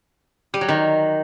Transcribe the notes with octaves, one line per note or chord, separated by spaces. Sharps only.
G3
F#3
D#3